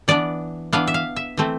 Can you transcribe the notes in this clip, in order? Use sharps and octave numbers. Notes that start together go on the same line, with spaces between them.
E3 B3 D4 D5
E3 B3 D4 F5
E5
F5
E5
E3 A3 C4